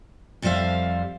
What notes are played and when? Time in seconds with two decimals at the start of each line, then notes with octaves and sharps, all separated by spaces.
0.42 F2 F3 G3 C5 E5 F5